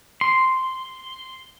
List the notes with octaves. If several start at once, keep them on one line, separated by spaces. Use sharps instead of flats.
C6